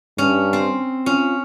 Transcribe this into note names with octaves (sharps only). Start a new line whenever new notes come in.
G2 C#4
C4
C#4 F4